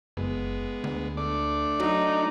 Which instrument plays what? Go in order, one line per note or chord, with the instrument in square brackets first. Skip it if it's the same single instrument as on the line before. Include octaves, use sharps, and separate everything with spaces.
[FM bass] F#1 [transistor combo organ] G#3 B3
[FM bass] D2
[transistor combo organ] A3 D4 D5
[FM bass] F#3 [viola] D#4